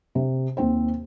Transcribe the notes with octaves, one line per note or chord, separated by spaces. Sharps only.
C3
D#2 C4 C5